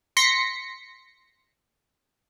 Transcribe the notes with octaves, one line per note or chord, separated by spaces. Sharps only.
C6 A#6 B6 C#7